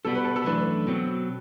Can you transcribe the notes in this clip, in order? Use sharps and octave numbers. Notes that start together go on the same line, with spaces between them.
C2 B2 G3 B3 A4
B4
A4
A4
F#2 E3 A3 D4 B4
B2 F#3 C4